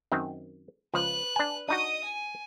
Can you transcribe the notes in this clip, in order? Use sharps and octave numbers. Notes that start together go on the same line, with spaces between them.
F#2 D#3 C4
C#2 F3 B4 F#6
D4 G#5
D4 D#4 F#4 D#5 D#6
G#5